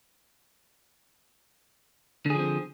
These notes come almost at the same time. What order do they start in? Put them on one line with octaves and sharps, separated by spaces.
D3 G#4 F3 C4